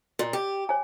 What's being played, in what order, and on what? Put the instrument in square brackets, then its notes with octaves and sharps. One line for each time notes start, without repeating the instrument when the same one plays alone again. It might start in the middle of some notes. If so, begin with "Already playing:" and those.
[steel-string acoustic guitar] A#2
G4
[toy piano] C#5 G#5